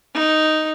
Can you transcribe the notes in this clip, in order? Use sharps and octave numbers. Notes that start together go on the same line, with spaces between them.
D#4